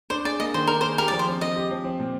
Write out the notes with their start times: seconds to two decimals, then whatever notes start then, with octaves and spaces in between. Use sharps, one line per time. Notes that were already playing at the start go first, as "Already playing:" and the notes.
0.10 D4 C5
0.25 G#4 D5
0.40 A#3 D#5
0.54 D#3 C5
0.67 D4 A#4
0.81 G#4 C5
0.98 G4 A#4
1.08 F3 D5
1.19 C5
1.27 C4
1.41 F3 D#5
1.56 G4
1.71 F3
1.84 C4
2.00 A#2